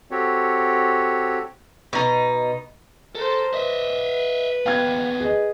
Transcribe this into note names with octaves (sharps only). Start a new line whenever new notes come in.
C4 F#4 G4 A4 C#5
B2 D#4
A4 A#4 C5
B4 D#5 E5
D#2 B3 F5 G5 G#6
G#4 D#5